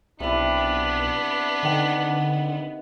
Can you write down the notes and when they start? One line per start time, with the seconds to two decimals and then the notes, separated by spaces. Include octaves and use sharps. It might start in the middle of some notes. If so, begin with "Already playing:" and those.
0.20 B1 C3 B3 D4 E4
1.63 D3 D#3 F#5